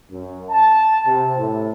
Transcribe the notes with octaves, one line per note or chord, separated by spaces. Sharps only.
F#2
A5
C3
A2